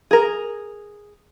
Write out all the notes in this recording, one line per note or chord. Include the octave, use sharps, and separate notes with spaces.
G#4 A#4